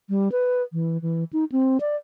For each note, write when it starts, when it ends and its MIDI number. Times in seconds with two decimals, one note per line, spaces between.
0.09 0.31 55
0.32 0.62 71
0.73 1.00 52
1.02 1.24 52
1.33 1.45 63
1.52 1.78 60
1.80 1.96 74